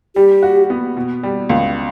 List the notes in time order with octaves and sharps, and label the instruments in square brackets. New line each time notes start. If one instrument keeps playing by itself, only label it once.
[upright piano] G3 [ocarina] G4
[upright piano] F#4
B3
B2
G3
C#2